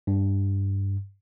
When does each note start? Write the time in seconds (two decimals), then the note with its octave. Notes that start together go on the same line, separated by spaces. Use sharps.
0.07 G2